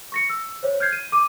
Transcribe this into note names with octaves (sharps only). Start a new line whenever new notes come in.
C#6 A#6 C#7
E6
C5 C#5
F6 G6 G#6 C7
D#7
D6 D#7